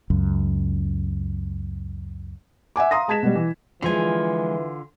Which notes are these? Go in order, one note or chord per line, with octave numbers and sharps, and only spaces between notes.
C#2 F#2
E5 F#5 G#5 D6
F5 A#5 C6 D#6 A#6
G#3 A5 G#6 B6 E7
B2 G3
E3
D3 E3 F3 G#3 F4 G#5